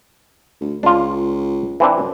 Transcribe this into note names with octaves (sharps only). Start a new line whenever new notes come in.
D2
C#2 D4 F4
E3 C4 D4
F#2